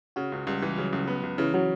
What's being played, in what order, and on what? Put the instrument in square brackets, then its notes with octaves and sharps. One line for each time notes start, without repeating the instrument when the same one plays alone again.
[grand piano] C#3 [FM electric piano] F#4
[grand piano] C#2
[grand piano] C#2 [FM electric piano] G3
[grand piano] E3
[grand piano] C#3 [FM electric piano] F#3
[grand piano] C#2
B3
C#2
[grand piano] C#3 [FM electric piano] E3
[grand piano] C#3 [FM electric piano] F#3